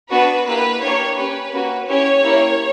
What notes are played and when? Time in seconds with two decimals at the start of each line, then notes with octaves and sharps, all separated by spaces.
0.11 B3 D4 F#4 B4
0.46 A#3 E4 G4 B4
0.82 A#3 D4 G4 C#5
1.17 C#4 G4 B4
1.53 A#3 C#4 F#4
1.88 C#4 E4 G4 C#5
2.23 A#3 E4 G4